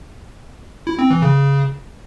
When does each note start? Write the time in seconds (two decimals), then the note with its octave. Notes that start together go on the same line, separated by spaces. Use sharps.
0.87 E4
0.99 C4
1.10 E3
1.22 C#3